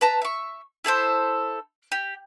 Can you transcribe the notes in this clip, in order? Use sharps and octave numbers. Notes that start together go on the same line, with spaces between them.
B4 A5 A#5
E5 C#6
E4 G#4 A4 C5
G4